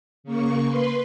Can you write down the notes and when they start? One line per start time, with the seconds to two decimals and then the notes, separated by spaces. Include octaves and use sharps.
0.24 C#3 A#3 C#6
0.67 B4 C6